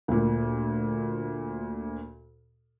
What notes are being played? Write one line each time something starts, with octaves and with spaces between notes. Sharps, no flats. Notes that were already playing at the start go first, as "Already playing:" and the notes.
D2 A#2